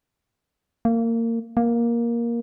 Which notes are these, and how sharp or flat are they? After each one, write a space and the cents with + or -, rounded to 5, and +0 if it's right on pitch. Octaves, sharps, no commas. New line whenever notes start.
A#3 -25
A#3 +10